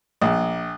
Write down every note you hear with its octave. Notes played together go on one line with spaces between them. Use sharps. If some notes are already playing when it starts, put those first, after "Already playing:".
A#1